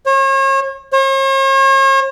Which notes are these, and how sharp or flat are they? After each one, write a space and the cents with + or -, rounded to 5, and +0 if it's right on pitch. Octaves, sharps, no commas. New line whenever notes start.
C#5 -40
C#5 -45